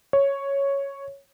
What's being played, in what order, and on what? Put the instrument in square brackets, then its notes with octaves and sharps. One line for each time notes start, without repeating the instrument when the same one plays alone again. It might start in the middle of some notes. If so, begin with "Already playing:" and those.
[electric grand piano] C#5